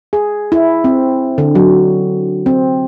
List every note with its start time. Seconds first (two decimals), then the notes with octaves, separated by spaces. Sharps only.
0.13 G#4
0.52 E4
0.84 C4
1.38 D3
1.55 F#3
2.46 C4